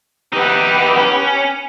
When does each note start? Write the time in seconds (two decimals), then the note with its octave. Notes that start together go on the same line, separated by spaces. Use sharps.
0.33 E3 B3 D#4 G4
0.97 C#4